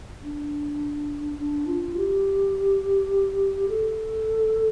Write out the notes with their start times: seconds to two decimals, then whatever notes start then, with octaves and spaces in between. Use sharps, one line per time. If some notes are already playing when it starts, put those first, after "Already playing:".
0.23 D4
1.39 D4
1.67 F4
1.96 G4
3.69 A4